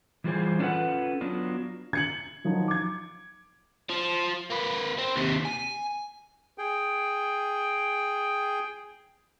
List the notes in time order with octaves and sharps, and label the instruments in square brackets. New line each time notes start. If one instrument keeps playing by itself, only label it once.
[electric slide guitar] E3 G3 F4 G#4 C5 G#5
C#4 D4 F4 A4 B4 F#5
F#3 B3 D4 F4
[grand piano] G#6 C#7 F#7
D#3 F3 F#3 D#4
D6 G#6
[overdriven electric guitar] F3
A#3 B4
C4
D#2 C3
G#5
[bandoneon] G#4 G5